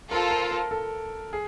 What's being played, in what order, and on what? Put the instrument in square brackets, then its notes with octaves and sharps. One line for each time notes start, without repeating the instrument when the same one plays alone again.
[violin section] F4 A4 C5 [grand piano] A#4
[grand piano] A#4
A#4
A4
G#4